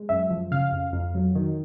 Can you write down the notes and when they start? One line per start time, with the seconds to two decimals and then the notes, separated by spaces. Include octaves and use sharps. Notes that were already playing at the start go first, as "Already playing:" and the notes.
Already playing: G#3
0.09 F#2 E5
0.31 F3
0.51 C#3 F5
0.72 F2
0.93 F2
1.15 F#3
1.36 D#3